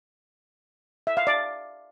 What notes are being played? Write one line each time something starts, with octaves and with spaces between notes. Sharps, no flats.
E5
F5
D5